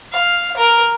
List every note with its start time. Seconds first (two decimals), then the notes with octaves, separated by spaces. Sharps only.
0.12 F5
0.57 A#4